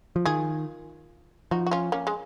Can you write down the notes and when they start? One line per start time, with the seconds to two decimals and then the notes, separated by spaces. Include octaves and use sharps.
0.16 F3
0.25 D#3 F4 G#4
1.51 F3 D#4 F#4
1.67 F#4
1.71 C#4 F4
1.92 A#3 C#4
2.07 G#3